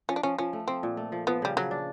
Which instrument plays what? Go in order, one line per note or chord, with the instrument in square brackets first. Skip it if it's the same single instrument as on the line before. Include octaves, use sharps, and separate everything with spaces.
[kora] F3 [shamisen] C#4
[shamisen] D4
[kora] F3 [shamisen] C#4
[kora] F3 [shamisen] C#4
[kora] A3
[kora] F3 [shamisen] C4
[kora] A#2
A3
F3
[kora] F3 [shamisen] B3
[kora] C#3 [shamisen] G3
[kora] C#3 [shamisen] F#3
[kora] D4